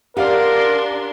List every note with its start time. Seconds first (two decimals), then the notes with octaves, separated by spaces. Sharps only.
0.17 D4 G4 A#4 D5 F5 F#5 C6